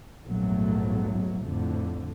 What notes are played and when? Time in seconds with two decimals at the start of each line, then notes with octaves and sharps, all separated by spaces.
0.24 A#1 E2 G#2 F#3 A3
1.44 F2 A2 D3